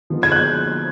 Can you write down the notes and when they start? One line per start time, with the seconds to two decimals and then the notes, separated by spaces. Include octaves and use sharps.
0.10 D3 F3 G#3 B3 D#4
0.23 G#6
0.32 F#6
0.36 G6